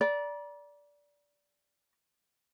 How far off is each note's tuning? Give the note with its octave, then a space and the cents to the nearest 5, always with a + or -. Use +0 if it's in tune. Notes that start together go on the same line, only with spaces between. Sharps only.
D5 -15 A#5 +40